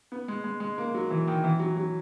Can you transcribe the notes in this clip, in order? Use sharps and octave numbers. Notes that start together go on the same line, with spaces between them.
B3
G#3
G#3
G#3
A#3
F#3
E3
D#3
E3
F#3
F#3